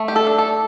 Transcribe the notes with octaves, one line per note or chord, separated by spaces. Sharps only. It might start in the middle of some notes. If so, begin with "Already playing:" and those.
Already playing: A3
G4
A4
D4
A4